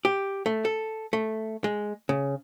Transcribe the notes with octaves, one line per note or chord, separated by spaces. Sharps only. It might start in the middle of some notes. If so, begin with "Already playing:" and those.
G4
A3
A4
A3
G#3
C#3